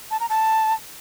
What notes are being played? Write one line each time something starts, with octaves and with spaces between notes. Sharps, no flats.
A5
A#5
A5